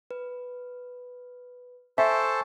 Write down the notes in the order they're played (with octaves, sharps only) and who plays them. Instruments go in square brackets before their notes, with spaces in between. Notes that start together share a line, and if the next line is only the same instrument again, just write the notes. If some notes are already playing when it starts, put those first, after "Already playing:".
[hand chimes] B4
[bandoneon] A4 C5 A5 [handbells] E5 [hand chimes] G#5 C#6